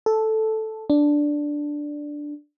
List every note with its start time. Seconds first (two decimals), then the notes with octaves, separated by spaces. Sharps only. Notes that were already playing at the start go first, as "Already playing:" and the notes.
0.06 A4
0.90 D4